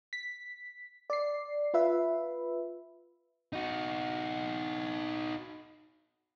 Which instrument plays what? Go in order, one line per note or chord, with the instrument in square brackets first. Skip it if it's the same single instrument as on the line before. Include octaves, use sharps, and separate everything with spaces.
[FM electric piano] B6
D5 C7
F4 B4 E5
[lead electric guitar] D#4 F#4